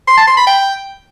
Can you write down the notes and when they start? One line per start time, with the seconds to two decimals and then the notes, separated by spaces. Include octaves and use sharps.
0.08 C6
0.17 A5
0.27 C6
0.37 B5
0.47 G5